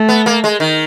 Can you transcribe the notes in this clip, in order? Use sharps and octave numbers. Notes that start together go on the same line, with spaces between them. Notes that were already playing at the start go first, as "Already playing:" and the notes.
Already playing: A3
B3
A#3
G#3
D#3